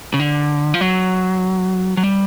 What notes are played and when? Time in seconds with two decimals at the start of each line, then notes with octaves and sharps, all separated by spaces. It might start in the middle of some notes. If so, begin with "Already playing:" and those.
0.14 C#3
0.20 D3
0.74 F3
0.81 F#3
1.97 F#3
2.03 G3